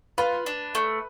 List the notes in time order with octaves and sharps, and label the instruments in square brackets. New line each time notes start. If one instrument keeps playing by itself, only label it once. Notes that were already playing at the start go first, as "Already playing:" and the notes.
[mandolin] F4 [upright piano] B4
[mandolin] D4
A3